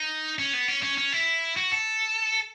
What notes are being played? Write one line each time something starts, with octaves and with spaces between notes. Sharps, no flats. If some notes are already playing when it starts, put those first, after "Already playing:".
Already playing: D#4
C#4
B3
C#4
C#4
C#4
E4
F#4
A4